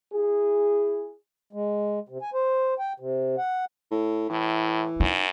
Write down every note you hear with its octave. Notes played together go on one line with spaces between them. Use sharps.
E4 G#4
G#3
C3
G#5
C5
G5
C3
F#5
A2
A2 E3
F#2 D#4